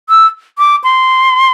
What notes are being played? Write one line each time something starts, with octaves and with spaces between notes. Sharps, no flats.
E6
D6
C6